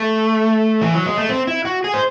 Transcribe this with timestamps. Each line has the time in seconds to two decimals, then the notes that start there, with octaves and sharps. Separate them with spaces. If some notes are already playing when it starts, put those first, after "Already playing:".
Already playing: A3
0.81 E3
0.94 F#3
1.06 G#3
1.18 A3
1.29 C4
1.47 E4
1.65 F#4
1.84 G#4
1.94 C5